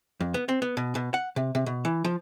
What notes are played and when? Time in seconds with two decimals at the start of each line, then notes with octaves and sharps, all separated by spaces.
0.20 F2
0.34 B3
0.49 C4
0.62 B3
0.77 B2
0.95 B2
1.14 F#5
1.36 C3
1.55 C3
1.66 B2
1.85 E3
2.04 F3